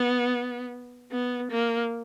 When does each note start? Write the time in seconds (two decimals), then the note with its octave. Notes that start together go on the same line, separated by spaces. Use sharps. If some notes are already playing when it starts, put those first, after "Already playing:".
Already playing: B3
1.11 B3
1.51 A#3